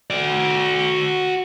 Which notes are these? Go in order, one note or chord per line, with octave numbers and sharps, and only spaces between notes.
F#4 D5